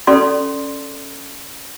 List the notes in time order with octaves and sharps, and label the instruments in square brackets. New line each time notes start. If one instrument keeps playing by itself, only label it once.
[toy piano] C#4 A4 D5 C6